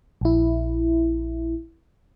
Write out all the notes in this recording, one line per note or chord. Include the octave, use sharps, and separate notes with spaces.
A#1 E4